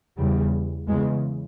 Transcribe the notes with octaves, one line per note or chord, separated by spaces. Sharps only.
E2 C#3 G3
E2 C#3 G#3